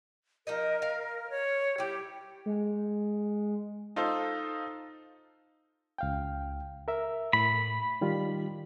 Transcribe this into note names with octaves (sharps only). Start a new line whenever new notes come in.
F3 D#4 A#4 D#5
F5
C#5
G3 E4 G4
G#3
D#4 F4 A4 C5
C#2 F5 G5
A#4 E5
A2 B5
D#3 G3 F4